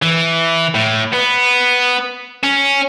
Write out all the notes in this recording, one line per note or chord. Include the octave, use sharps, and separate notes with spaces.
E3
A2
B3
C#4